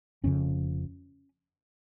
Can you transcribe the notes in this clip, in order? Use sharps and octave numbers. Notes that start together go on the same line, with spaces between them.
F1 F2 C#3 C#4